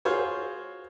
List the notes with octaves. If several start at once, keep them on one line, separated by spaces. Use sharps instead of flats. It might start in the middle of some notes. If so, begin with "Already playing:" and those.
F4 F#4 G#4 C5 C#5